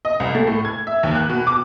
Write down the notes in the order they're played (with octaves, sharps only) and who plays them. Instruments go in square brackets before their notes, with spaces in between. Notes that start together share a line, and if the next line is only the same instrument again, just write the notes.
[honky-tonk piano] D#5
C2
A3
A2
G#6
E5
D#2
F#6
B2
D6